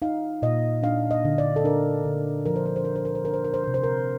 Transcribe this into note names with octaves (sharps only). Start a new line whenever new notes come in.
D#4 F5
A#2 D#5
D4 F5
D#5
D3
D5
A4
D4 A#4
D3
F3 A#4
C5
A#4
C5
F3 A#4
C5
A#4
C5
D4 A#4
C5
A#4
C5
C3 A#4
C5
A#4